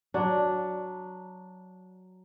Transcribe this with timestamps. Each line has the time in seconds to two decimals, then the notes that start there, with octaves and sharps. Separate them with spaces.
0.14 F#3 D4